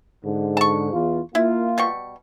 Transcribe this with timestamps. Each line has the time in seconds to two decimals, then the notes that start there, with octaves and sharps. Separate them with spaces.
0.24 G#2 D3
0.57 A5 C#6
0.93 E2 F4
1.35 A#3 E4 F4
1.78 B2 G3 C#6